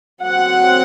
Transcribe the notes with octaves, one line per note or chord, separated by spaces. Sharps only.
F#3 C4 F#5